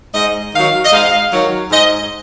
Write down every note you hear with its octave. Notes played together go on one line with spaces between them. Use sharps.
G#2 D#5
D#3 F#3 F5
D#5
G#2 F5
D#3 F#3
G#2 D#5